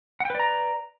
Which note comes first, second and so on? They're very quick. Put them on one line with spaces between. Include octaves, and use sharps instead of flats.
F#5 G5 B4 D5 A#5